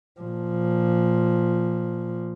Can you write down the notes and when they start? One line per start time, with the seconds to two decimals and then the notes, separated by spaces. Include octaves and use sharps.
0.21 A#2 F3